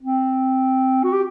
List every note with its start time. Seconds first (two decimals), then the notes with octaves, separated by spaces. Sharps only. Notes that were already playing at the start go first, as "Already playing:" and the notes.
0.03 C4
1.04 F#4
1.13 G4